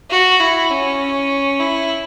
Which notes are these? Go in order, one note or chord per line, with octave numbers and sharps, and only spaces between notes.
F#4
E4
C#4
E4